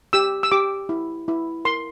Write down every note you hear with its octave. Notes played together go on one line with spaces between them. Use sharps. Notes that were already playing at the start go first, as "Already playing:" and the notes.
G4 E6
E6
G4 D6
E4
E4
A#4 C6